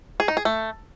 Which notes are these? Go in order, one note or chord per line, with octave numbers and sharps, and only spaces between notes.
G#4
D#4
G#4
A3